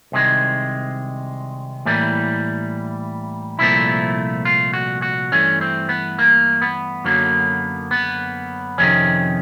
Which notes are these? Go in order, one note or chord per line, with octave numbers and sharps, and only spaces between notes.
C2 C3 D#3 G#3
A2 E3 G3 A#3
C2 A#2 F3 A3 E4
F4
F#4
F#4
G2 E3 A3 C#4
C4
B3
A#3
B3
F#2 D3 F#3 A#3
B3
F2 C3 D#3 C#4